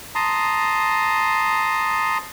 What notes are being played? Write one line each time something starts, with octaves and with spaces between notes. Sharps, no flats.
A5 A#5 C6 D#6